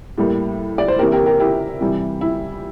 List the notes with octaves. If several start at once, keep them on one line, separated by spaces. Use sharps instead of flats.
A2 G3 A#3
D5
C5
C3 E3 A#3 G4 A#4
G4 A#4
G4 A#4
E4 G4
C3 E3 G3
E4